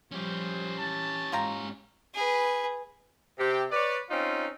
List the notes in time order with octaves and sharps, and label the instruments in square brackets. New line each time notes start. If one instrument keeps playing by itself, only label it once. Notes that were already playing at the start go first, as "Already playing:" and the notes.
[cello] F3 G3 [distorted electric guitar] C#4 G4 [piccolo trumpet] C5
[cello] E3 [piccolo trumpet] A5
[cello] G#2 [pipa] F4 G5 A#5
[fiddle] G#4 B4
[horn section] C3 G4
B4 C#5 D5
C4 C#4 D#4 F4